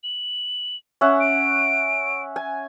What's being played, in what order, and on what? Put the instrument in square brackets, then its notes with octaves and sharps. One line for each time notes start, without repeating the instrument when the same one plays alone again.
[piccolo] F#7
[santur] C#4 E5 F#5
[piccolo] D7
[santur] G#5